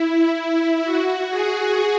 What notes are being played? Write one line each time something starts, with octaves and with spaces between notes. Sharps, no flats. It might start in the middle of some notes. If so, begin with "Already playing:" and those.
Already playing: E4
F#4
G#4